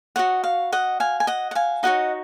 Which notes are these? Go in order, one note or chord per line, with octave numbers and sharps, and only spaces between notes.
F#4 C#5 D#5 F#5
F5
D#5 F#5
F5 G#5
G#5
D#5 F#5
F#5
F5 G#5
D#4 F#4 C#5 D#5 F#5